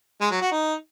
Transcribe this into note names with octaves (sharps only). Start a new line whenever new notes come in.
G#3
F#3
F#4
D#4